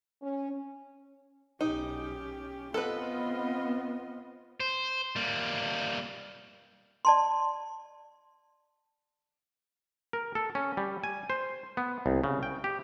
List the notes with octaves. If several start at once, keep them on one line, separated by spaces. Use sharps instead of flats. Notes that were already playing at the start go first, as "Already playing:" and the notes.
C#4
B1 C#4 D#4 G4
B3 C4 F4 A4 B4 D#5
C5
G3 A#3
D5 A5 C6
A#4
A4
C#4
G3
G#5
C5
B3
C2
C#3
G5
G4